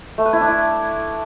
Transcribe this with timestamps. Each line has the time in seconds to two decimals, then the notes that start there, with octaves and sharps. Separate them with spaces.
0.18 A3
0.25 B4
0.33 E4
0.41 D4
0.48 E4